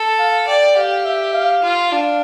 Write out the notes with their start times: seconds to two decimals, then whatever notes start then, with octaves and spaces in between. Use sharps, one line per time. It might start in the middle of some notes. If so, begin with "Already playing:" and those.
Already playing: A4
0.19 F5
0.47 D5 G5
0.76 G4 F5
1.05 E5
1.34 F5
1.63 F4
1.91 D4 F5